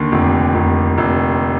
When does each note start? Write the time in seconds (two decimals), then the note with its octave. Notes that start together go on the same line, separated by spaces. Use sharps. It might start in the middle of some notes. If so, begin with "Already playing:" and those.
Already playing: D#2 D3
0.12 F1
0.55 F1
0.98 F1